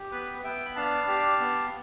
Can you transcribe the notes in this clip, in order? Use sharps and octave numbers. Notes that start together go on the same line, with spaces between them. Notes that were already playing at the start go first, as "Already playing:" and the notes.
Already playing: G4
B3 B4
B3 E5 G5
B5
D4 F5 A5
G4
B3